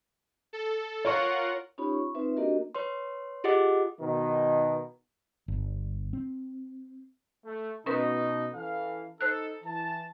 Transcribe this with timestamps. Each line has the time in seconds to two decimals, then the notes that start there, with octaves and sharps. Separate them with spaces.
0.53 A4
1.05 F4 A#4 C#5 F#5 C#6
1.78 C#4 D#4 F4 G4 C#5 B5
1.93 C#6
2.15 C4 D#4 F4 B4 C5 E5
2.37 A#3 D4 F#4 G4 A#4 D#5
2.75 B4 C#5 C6
3.44 F4 G4 G#4 D#5 F#5 D6
4.00 B2 D#3
5.48 G1
6.13 C4
7.44 A3
7.86 B2 C#4 D#4 A#4 B4
8.54 E3 A4 F5
9.21 D#4 A4 C5 F#6
9.63 E3 A5